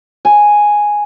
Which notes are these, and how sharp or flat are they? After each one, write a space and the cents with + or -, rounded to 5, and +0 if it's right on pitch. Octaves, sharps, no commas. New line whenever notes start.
G#5 +0